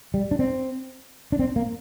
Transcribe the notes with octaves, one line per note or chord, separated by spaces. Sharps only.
G3
D4
C4
D4
C4
A#3